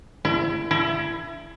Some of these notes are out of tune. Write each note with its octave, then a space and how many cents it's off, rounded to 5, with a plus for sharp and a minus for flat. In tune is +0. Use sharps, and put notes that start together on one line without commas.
E4 +30
E4 +25